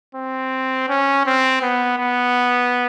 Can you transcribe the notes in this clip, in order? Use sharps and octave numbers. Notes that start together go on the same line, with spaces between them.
C4
C#4
C4
B3
B3